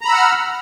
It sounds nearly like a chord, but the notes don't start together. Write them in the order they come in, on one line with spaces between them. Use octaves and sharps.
A#5 B5 E6 F#5 F6